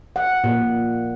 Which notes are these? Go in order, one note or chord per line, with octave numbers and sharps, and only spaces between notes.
F#5
A#2